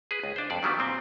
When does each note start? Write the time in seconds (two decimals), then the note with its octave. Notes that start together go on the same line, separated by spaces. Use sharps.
0.11 G#4 B4
0.23 C#2
0.36 D4 C5
0.50 F2 D5
0.63 D#3 F#3 G3 B3 D4
0.79 A#2 C4